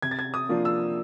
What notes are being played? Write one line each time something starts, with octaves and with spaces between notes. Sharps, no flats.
C3 G#6
A6
G#6
D#6
F3 A#3 D4 F4
E6